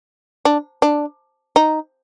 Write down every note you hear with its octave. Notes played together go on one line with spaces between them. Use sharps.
D4
D4
D#4